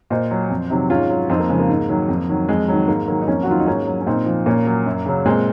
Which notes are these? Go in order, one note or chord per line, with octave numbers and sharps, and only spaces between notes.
A#2 C5 D#5
F#3
F2
C3 D#3 F#3
G#2 C#4 F4
F#3
F2 C4 D#4
A#3
C#3 F3 G#3
A#3
G#2
D#3 F#3
F2
D#3 F#3
F2 G#3
D#3 F#3
G#2 A#3
D#3 F#3 A#3
D#4
F2 A#3 C#4
F#4
D#3 F#3 F4
D#4
G#2 A#3 C#4
F#3
C#4
A#2 C4 D#4
F3
A#2 A#3 C#4
F#3
F#2
C#3 F#3
A#2 G#3 C4